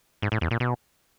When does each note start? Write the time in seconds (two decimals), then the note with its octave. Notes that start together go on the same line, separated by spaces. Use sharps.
0.22 G#2
0.32 A2
0.41 E2
0.51 A#2
0.60 B2